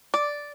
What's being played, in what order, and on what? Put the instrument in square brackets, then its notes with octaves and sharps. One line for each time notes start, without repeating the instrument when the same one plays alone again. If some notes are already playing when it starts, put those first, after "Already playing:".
[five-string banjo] D5